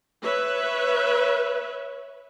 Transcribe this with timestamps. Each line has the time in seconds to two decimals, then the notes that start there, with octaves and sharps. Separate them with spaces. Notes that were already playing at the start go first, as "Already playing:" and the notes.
0.21 B4 C#5 E5